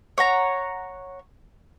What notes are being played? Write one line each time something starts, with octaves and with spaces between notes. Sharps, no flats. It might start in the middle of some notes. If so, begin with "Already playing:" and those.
C#5 F#5 A#5